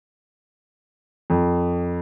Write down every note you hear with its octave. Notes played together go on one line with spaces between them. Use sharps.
F2